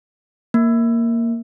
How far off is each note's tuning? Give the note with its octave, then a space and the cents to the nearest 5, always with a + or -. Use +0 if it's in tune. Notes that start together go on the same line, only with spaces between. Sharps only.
A#3 -5